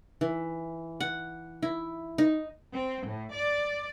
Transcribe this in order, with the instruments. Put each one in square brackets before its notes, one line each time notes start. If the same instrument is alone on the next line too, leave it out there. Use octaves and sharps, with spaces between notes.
[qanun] E3
F#5
E4
D#4
[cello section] C4
A2
D5